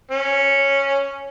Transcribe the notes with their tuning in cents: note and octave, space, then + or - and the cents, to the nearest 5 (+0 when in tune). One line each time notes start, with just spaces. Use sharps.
C#4 -5